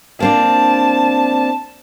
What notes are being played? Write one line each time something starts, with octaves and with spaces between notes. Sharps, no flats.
A#3 C4 D4 A5